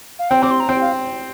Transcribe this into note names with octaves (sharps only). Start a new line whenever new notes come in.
F5
C4 G5
C4 D6
C6
A#5
C4 G5
F5